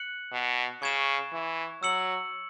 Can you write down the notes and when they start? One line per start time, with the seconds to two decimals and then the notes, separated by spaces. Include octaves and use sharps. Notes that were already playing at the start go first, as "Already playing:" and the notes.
Already playing: F#6 C#7 F#7
0.32 B2
0.82 C#3 C#6 G#6 E7
1.32 E3
1.82 F#3 E6 C#7 F#7